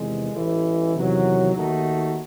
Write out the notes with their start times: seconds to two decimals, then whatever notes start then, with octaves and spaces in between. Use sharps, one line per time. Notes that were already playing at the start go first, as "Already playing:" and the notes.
Already playing: E2 C3 D#3 G#3
0.33 A1 G#2 E3
0.94 E2 C3 D#3 F#3
1.55 D#2 D#3 A3 D#4 F#4